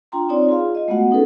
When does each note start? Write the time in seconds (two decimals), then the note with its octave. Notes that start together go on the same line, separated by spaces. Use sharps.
0.12 D4 F4 G5 A#5 C6
0.29 C4 D#4 F4 C#5 D5 C6
0.48 F4 G#4 F5
0.75 F4 D#5
0.88 G#3 A3 B3 F#4 F#5
1.11 C#4 D#4 G#4 A4 B4